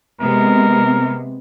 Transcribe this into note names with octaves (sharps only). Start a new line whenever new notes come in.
C3 G#3 B3 A#4